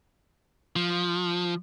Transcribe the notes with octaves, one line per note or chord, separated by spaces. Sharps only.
F3